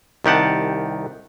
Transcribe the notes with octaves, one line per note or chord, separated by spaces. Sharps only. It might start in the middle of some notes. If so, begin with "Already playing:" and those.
C2 D#3 G4 F#5 A5